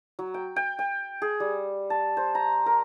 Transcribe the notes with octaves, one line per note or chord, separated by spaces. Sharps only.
F#3
G5
G5
G5
G#4
G3
A5
C5
A#5
A#4